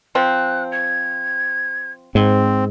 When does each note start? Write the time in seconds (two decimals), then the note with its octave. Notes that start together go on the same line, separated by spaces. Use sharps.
0.15 F3 C4 F#6
0.72 G#6
2.15 G#2 C4